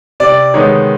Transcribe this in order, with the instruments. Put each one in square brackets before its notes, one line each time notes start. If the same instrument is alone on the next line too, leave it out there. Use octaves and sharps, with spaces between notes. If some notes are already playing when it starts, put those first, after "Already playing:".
[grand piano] C3 [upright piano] D5
[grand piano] D#3 G#3 B3 D#4 [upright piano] C#5